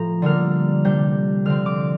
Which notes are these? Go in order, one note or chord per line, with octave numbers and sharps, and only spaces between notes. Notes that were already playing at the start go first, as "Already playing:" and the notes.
Already playing: A2 F3 A#5
D3 G3 A#3 D4 F6
C3 G3 D4 G6
D3 F3 C4 F6
D6